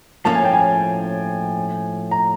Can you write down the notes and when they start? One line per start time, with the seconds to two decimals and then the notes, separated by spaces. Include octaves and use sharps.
0.25 A2 F3 A#3 C#4 A5
0.35 G#5
0.44 G5
0.53 G#5
2.11 A#5